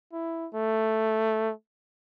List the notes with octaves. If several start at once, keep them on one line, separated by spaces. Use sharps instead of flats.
E4
A3